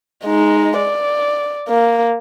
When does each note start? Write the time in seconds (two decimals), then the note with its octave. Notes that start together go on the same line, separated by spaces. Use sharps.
0.24 G#3 D#4
0.78 D5
1.68 A#3